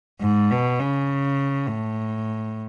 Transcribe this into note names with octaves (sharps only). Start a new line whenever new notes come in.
G#2
B2
C#3
A2